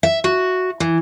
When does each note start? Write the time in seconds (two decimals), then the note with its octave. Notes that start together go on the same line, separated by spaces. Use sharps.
0.03 E5
0.24 F#4
0.80 E3